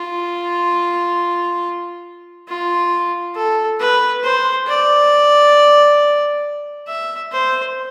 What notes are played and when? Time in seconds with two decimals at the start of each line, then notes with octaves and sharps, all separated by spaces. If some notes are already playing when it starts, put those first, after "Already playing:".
Already playing: F4
2.48 F4
3.35 A4
3.80 B4
4.23 C5
4.67 D5
6.88 E5
7.32 C5